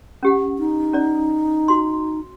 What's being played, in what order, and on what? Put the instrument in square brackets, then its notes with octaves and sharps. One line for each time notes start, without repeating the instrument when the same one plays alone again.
[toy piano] C#4 G4 F#5
[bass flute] D#4
[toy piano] C#4 D5
F#4 C6